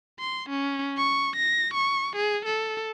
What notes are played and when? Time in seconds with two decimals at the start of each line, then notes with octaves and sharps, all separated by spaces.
0.20 C6
0.50 C#4
0.97 C#6
1.36 A#6
1.74 C#6
2.16 G#4
2.45 A4